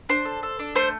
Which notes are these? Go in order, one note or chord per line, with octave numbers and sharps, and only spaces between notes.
D4 C5 C6
A4
A4
D4
A3 C5 C6